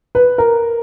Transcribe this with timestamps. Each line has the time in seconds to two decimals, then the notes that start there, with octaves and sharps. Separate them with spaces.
0.15 B4
0.38 A#4